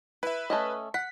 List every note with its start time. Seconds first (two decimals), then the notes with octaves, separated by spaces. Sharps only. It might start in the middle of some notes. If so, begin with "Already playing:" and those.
0.23 E4 B4 E5
0.50 A3 C#4 D#5
0.94 F#5 B6